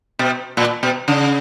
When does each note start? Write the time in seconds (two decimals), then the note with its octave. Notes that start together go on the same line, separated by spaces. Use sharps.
0.19 B2
0.57 A#2
0.83 B2
1.08 C#3